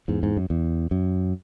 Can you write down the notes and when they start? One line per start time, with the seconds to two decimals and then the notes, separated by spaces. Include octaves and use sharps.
0.08 E2 G#2
0.23 G#2
0.37 F#2
0.50 E2
0.91 F#2